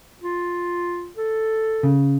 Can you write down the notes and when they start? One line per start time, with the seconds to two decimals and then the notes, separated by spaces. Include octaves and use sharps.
0.22 F4
1.17 A4
1.83 C#3